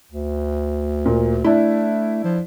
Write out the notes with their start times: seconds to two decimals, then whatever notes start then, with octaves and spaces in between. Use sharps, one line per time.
0.11 D2
1.05 A#2
1.44 A3 D4 E4
2.24 F3